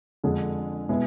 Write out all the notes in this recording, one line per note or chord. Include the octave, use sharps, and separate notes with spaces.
F2 D3 G#3 D4 G#4
B2 G#3 B3 E4 G#4